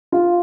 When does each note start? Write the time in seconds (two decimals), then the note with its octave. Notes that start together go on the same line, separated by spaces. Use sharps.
0.12 F4